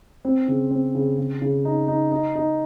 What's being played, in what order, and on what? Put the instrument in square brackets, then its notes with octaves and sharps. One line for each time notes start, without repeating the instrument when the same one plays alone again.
[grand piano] C4
C#3
C4
C#3
C#3
C#3
D#4
D#4
D#4
D#4